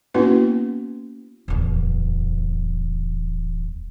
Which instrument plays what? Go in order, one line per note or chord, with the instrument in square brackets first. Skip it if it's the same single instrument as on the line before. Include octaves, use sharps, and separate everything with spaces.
[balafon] A#3 B3 C#4 E4 F#4 B4
[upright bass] D1 E2